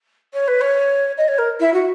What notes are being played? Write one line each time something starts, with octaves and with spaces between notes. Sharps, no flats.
C#5
B4
C#5
D#5
C#5
A#4
E4
F#4